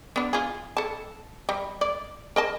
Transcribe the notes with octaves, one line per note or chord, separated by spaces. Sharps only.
B3 D4
F4 G#4
A4 A5
G3
D5
A#4 D#5 A5